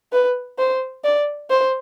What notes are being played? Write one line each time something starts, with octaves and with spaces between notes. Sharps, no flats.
B4
C5
D5
C5